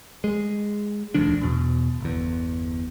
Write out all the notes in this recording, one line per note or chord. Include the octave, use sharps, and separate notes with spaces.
G#3
E1 D2 F3 D4
E2 B2
G1 E2